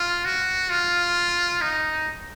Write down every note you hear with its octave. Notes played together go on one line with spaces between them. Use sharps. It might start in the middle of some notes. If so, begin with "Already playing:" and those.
Already playing: F4
F#4
F4
D#4